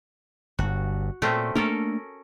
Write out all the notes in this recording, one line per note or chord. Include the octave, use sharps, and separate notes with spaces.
G1 G2 F#4
A#2 A3 C4 C#4
A3 A#3 C#4 D4 A4 A#4